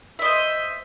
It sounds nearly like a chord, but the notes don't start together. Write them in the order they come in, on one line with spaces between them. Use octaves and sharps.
E5 D#5 C5